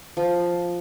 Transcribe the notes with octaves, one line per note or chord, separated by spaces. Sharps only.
F3